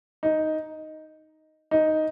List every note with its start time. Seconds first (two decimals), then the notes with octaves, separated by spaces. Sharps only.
0.23 D#4
1.71 D#4